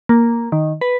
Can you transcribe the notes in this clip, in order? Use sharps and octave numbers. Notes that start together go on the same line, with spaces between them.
A#3
D#3
B4